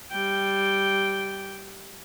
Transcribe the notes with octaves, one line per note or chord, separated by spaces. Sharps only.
G3 G5